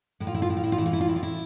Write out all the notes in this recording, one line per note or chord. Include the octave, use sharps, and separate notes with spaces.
A2 E4
F4
E4
F4
A2 E4
F4
E4
F4
E3 E4
F4
E4
F4
A2 E4
F4
E4